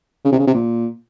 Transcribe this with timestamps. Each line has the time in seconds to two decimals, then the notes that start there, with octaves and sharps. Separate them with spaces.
0.25 C#3
0.32 C3
0.40 C#3
0.47 C3
0.54 A#2